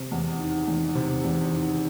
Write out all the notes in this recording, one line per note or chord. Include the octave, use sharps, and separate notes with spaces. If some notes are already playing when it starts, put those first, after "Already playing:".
Already playing: C3
E2
D#3
E2
C3
E2
D#3